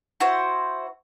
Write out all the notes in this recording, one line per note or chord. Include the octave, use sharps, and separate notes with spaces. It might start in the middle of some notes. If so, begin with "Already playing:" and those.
E4 F#4 C5